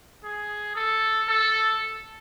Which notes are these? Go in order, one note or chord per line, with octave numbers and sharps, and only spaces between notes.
G#4
A4
A4